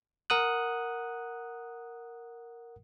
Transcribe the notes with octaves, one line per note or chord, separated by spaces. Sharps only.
A#4 F#5 D#6 F#6